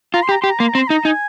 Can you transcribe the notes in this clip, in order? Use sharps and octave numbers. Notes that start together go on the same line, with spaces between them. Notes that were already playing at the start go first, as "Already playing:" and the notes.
F4 A#5
C6
G4
A#5
G4 C6
A#5
A#3 C6
A#5
C4
C6
D#4 A#5
D#4 G#5